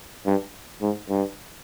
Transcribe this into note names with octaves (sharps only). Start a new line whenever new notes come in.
G2
G#2
G2